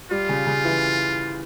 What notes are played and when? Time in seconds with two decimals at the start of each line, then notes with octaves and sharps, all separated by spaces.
0.11 G3 F4
0.29 C#3
0.47 C#3
0.65 E3